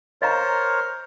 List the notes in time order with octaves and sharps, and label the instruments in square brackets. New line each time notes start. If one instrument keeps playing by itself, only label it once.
[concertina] A#4 C5 C#5 [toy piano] D#5 F5 A#5